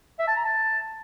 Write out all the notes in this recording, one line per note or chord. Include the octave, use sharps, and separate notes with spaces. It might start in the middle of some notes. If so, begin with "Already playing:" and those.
E5
A5
A#5
A5